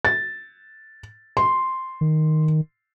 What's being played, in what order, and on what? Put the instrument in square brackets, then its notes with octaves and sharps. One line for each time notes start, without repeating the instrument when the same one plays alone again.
[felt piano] A6
C6
[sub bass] D#3